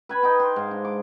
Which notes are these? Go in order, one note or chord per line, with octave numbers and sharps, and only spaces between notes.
B4 G#5 B5
D#4 G5 G#5
C6
G#2 F5
D4
D6